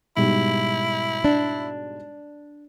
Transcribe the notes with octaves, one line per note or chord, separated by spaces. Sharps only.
G#2 B2 G3 E4
D4